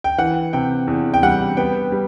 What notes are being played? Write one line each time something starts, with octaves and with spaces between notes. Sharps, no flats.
G5
E3 F#5
C3 G5
E2
G5
G3 F#5
B3 G5
G3